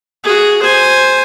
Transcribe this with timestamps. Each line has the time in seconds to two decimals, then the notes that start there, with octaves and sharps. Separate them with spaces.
0.24 F#4 G#4
0.62 C5 G#5